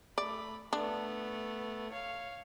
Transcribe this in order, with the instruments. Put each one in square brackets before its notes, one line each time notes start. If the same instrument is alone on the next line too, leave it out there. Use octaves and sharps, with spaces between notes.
[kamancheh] A3 B5 [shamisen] D5
[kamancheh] A3 B3 [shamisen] D4
[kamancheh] C#5 F5